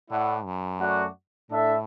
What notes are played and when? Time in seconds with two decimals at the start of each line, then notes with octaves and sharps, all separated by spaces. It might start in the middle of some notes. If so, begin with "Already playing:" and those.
0.10 A2 A3 E4 D5 F#5
0.45 F#2
0.80 A3 F#4 D5 F#5
1.50 A2 D4 A4 E5